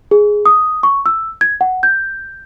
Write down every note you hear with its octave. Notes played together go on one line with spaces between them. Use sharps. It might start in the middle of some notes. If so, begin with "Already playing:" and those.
G#4
D#6
C#6
E6
G#6
F#5
G6